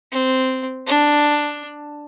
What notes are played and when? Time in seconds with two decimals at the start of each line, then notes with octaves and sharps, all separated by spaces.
0.12 C4
0.87 D4